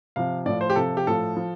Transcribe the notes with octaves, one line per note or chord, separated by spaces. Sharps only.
C3 F3 F5
A2 F3 D5
C5
G4
C3 F3 A4
G4
A2 F3 A4
F3